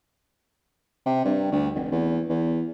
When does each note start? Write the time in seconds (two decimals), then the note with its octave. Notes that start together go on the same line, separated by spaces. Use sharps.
1.06 C3
1.25 G2
1.52 D2
1.75 F1
1.92 E2
2.29 E2